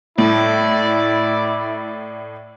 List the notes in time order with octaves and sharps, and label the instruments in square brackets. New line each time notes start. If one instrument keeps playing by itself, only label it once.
[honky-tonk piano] A2 [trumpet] E4 [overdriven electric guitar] D5